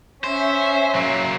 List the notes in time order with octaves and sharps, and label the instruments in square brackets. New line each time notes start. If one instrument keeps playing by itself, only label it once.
[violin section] C#4 E5 [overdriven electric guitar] C5
[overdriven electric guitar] F#3 A#3